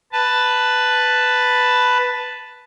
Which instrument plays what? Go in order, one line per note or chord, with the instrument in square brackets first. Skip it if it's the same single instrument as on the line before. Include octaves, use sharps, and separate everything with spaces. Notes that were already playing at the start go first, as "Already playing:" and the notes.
[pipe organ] B4 A5